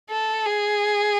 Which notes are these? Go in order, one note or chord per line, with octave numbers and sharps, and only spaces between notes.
A4
G#4